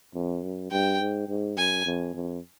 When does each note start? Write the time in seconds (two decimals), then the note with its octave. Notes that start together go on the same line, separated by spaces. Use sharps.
0.14 F2
0.43 F#2
0.71 G2 G5
1.00 G#2
1.28 G#2
1.57 F#2 G#5
1.86 F2
2.14 F2